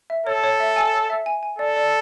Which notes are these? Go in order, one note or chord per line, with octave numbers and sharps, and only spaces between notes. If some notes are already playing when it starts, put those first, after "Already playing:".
E5
A4 C#5
C#5
E5
G#5
C#5
E5
G#5
G#5
A4 D5
D5